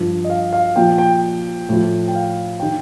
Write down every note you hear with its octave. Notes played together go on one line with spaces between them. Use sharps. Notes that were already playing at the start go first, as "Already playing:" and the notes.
Already playing: G2 F3
D#5
F5
F5
A#2 F3 G5
G5
A2 F3
G5
F5
D#3 G5